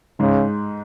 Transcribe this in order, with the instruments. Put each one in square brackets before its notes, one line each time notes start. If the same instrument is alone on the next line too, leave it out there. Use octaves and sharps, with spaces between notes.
[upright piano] G#2 G#3 [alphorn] C#3